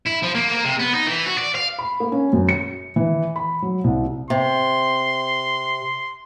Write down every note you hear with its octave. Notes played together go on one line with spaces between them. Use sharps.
E4
F3
A#3
A#3
C3
B3
D#4
E3
F#4
D5
F5
B5
A#3
C#4
F#2
C#7
E3
B5
F#3
C2
C3 C6